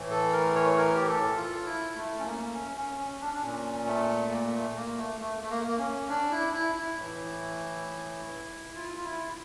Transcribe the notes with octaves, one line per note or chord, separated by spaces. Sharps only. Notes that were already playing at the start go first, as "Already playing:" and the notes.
Already playing: A2 E3
A4
A#4
C#5
A#4
G4
A4
F4
E4
A3
C#4
A#3
C#4
C#4
C#4
D4
D4
A#2 C#4
A3
A#3
A3
A#3
A3
A3
A3
A#3
A#3
C#4
D4
E4
E4
E4
A2 E3
F4
F4
E4